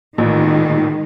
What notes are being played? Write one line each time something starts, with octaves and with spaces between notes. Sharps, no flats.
A1 A#2 D#3 G#3